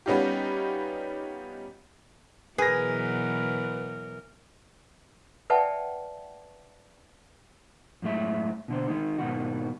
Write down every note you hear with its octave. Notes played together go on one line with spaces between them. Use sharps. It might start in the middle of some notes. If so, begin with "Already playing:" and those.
G3 B3 C#4 D#4 F4 G4
B2 E3 F#3 G#4 A#4 B4 A#6
B4 D5 E5 F#5 G5 A5
F#2 A2 G#3 E5
B2 D3 C5
D#3 G#3 D#4
G#2 B2 D#3 F#4